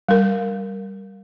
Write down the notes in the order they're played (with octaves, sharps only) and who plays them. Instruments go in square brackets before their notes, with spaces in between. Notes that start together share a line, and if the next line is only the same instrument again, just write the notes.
[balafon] G3 A#4